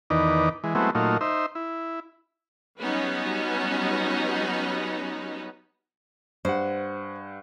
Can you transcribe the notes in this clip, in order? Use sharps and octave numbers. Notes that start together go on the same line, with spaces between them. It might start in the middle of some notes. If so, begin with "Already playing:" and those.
E2 D#3 D#4 B4 D5
E3 G#3
F#3 G#3 A3 B3 C4 E4
A#2 F#3 A3 D#4 F4
D#4 C5 E5
E4
F#3 G3 B3 C#4 D#4 B4
G2 C5 F#5